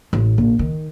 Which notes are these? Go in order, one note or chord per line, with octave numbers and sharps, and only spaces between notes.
A1
A#1
D#3